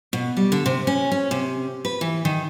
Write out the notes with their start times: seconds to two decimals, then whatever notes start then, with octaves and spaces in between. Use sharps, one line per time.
0.13 B2
0.37 G3
0.52 D3
0.66 C3
0.87 C#4
1.12 C#4
1.31 C3
1.85 B4
2.01 E3
2.25 D#3